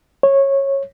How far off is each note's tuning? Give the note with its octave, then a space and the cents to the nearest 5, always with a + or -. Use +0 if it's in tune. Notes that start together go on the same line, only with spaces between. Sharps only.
C#5 -15